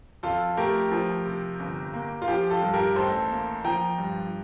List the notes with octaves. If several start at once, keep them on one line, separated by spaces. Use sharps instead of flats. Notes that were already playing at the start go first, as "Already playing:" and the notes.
F2 F4 A4
A3 G4 A#4
F3
C3
G1
A#3
F4
F3 G4
F4 A4
G2
G4 A#4
A1 A4 C5
A#3
F3 G5 A#5
G2